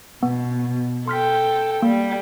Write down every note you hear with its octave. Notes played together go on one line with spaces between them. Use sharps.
B2 B3
A4 G5 C6 F6 B6
G3 A#3